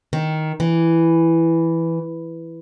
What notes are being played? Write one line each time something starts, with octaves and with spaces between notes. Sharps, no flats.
D#3
E3